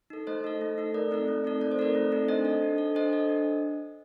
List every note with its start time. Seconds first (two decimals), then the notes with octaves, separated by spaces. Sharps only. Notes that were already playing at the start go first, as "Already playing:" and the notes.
0.10 D#4 A4
0.27 A3 C5 D#5
0.44 D#4 A4
0.61 A3
0.78 D#4 A4
0.94 A3 A#4 D5
1.11 C4 D#4 A4
1.28 A3
1.45 C4 D#4 A4
1.61 A3 D5
1.72 C5
1.79 C4 D#4 A4 A#4 D5
1.95 A3
2.12 C4 D#4 A4
2.28 D4 C5 D#5
2.45 A4
2.62 D4
2.78 A4
2.95 D4 C5 D#5
3.13 A4
3.29 D4